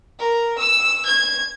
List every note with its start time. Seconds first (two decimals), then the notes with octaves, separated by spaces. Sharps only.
0.19 A#4
0.58 E6
1.05 G#6